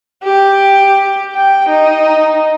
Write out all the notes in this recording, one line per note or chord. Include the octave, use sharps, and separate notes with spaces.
G4
G5
D#4